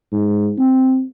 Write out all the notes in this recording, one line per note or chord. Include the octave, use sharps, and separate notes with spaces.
G#2
C4